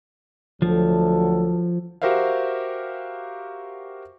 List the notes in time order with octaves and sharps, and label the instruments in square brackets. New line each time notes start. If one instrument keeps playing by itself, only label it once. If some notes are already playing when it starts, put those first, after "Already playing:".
[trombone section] D2 F#3 A4 [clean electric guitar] F3
[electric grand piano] F#4 G4 A#4 C5 E5 F5